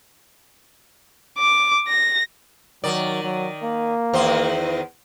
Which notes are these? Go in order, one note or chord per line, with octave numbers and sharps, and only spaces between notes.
D6
A#6
D#3 F#3 D5
F#3
A#3
E2 D#3 C5